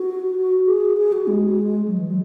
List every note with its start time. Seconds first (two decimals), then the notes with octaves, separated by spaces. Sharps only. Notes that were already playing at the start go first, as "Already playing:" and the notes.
Already playing: F#4
0.67 G#4
0.97 G#4
1.12 F#4
1.27 G#3
1.88 F#3
1.98 E3
2.08 F#3